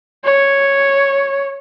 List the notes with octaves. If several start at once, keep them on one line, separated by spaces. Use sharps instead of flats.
C#5